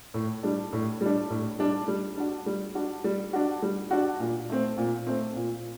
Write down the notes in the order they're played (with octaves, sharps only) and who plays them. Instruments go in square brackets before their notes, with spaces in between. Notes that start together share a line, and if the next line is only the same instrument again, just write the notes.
[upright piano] A2
G3 D4
A2
G3 D4
A2
G3 D4
G3
D4 F#4
G3
D4 F#4
G3
D4 F#4
G3
D4 F#4
A#2
A3 C4
A#2
A3 C4
A#2